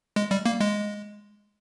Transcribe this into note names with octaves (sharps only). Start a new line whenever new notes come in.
G#3
G3
A#3
G#3